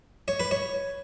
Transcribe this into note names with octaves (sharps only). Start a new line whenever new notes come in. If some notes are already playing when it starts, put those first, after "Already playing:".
C#5
B4
C#5